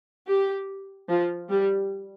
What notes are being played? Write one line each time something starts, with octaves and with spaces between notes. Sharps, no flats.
G4
F3
G3